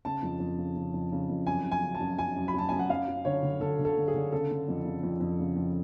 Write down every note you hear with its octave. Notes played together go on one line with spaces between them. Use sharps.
C#3 A5
F2
F2
C#3
C#3
F2
C#3
F2
F#2 G#5
F#2
G#5
C#3
A5
F#2
F#2 G#5
F#2
B5
F#2 A5
F#2 G#5
F#5
F#2 F5
F#2
D3 C#5
D3
D3 A4
D3
A4
D3
G#4
D3
C#3 A4
C#3
F2
C#3
F2
F2
C#3
F2